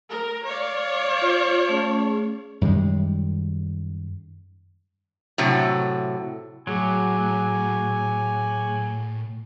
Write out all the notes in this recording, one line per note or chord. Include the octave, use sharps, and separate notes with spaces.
A#4
C#5 D5 F5
F4
A3 C#4 G#4
F#2 D#3 G3 G#3
A2 C3 F#3
A2 F#3 G#4 G#5 D6